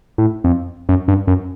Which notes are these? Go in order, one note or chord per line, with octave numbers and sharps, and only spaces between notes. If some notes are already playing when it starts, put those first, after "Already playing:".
A2
F2
F#2
G2
F#2